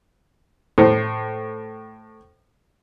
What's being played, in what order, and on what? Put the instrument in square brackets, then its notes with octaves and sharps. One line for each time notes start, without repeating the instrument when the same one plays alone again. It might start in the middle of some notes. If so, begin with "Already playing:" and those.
[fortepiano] A2 C5